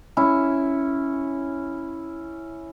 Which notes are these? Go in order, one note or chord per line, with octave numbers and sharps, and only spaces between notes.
C#4 E4